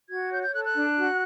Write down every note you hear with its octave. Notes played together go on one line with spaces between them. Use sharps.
F#4 G#6
C#5 G6
G6
A4 F#6
F#6
D4
F#4